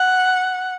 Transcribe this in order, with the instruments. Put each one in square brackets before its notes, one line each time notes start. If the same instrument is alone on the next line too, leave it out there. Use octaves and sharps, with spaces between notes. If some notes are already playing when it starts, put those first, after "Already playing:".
Already playing: [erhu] F#5